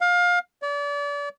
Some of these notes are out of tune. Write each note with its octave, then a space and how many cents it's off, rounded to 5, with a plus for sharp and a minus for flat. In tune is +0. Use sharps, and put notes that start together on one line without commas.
F5 +25
D5 -35